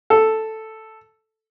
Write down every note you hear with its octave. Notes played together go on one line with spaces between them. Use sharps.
A4